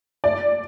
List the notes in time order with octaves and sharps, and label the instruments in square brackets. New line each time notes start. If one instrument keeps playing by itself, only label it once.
[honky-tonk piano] D5